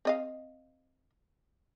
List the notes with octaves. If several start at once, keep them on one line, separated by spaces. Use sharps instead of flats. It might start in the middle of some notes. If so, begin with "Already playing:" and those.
C4 D#5 F5